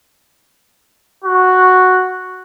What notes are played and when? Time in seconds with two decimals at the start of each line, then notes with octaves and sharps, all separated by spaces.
1.24 F#4